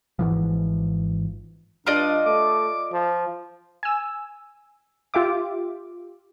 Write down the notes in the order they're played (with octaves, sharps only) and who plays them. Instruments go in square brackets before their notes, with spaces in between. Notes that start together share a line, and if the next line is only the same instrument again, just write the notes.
[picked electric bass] G#1 G#2 E3 F3
[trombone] G2 [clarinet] D4 [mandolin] F4 D5 D#5
[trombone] A3 [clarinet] D6
[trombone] F3
[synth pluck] G#5 E6
F4 G4 E5 D6